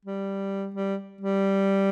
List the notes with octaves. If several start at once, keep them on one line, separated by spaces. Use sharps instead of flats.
G3
G3
G3